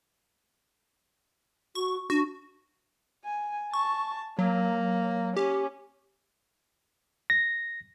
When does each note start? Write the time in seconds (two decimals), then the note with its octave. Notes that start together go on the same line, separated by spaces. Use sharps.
1.75 F#4 C#6
2.10 D4 F#4
3.24 G#5
3.73 A5 C#6
4.39 F#3 A#3
5.37 C#4 G4
7.30 A#6